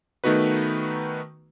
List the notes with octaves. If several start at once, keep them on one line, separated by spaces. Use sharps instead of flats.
D#3 A3 B3 D#4 F#4 B4